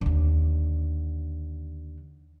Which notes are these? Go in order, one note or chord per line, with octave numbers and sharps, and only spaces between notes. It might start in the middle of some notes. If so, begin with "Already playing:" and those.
D#2 D3